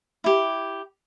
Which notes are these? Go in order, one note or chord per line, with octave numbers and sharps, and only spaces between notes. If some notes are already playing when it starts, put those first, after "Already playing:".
E4 G4